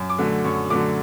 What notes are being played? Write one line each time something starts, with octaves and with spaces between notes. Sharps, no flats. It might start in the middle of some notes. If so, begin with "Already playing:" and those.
Already playing: F#2
D6
D3 F#3 A3
F#2 C#6
D3 F#3 A3 D6